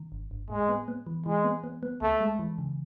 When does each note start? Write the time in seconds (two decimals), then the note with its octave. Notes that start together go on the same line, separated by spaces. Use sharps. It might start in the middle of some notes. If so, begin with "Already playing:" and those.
Already playing: D#3
0.12 G1
0.31 G1
0.50 A2 G#3
0.69 B3
0.88 B3
1.07 E3
1.26 E3 G#3
1.44 B3
1.64 B3
1.83 B3
2.01 C#2 A3
2.21 G#3
2.39 E3
2.58 C#3